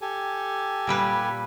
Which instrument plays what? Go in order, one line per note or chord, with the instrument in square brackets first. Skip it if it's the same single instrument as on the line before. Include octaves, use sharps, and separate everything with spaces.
[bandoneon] G4 A4 G#5
[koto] A#2 G3 B4